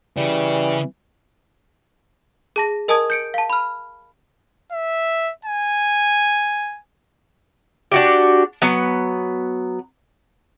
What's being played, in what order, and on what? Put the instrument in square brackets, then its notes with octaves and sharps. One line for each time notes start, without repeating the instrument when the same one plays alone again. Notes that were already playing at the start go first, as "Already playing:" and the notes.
[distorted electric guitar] C#3 [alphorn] E3 [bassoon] G3
[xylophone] G#4 A5 A#6
A#4 D#5 G#5 A5 D#6 G#6
G6 C#7 D7
F5 A5
B5 F6
[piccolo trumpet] E5
G#5
[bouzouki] D4 F#4 G4
F#3 B3